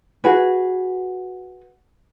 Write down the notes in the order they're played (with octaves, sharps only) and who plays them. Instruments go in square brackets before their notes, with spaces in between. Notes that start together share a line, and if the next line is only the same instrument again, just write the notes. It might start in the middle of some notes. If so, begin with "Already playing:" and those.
[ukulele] F#4 G#4 B4